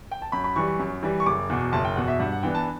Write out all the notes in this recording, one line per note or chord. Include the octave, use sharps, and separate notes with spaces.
G5
A5
F#2 B5
B5
E3 G3 C#6
C#6
F#2
E3 G3
C#6
F#1 D6
E2 B2
F#1 A5
G5
E2 B2 F#5
E5
G2 F#5
F#5
E3 B3 D4 G5
A5